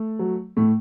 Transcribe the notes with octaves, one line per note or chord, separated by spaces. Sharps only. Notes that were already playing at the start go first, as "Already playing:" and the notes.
Already playing: A3
F#3
A2 A3